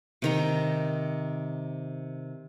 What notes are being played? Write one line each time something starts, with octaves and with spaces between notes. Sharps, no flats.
C3 D#3 A#5